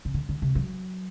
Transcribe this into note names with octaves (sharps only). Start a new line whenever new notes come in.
C3
D3
D3
C3
F#3